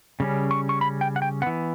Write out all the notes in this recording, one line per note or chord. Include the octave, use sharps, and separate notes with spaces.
C#3 G3 C#4
C#6
C#6
B5
G5
F#5
G5
E3 B3 F#5